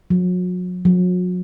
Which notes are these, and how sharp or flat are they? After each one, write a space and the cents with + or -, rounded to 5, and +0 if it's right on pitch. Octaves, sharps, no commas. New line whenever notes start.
F#3 -40
F#3 -40